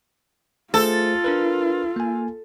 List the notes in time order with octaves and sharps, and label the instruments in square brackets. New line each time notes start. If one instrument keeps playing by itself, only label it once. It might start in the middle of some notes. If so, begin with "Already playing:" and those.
[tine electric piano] A3 G#4 C5 [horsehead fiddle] F4 [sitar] A4
[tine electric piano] D4 A#4 B4
A#3 G#5